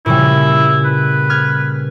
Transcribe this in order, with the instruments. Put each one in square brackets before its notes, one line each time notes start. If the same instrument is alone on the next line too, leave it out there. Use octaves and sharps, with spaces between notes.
[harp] A#2 C#3 G3 [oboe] E4
[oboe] B4
[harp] F6 G#6